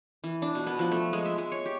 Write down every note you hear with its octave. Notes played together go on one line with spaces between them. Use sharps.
E3
D4
B2
B3
F3
A3
G#3
E5
G#3
C#5
G4